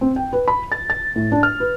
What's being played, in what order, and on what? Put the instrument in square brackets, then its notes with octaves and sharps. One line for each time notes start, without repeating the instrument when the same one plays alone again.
[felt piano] C4
G5
B4
B5
A6
A6
A2
D4
F6
B4